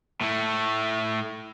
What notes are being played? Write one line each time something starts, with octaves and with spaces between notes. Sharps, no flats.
A2 A3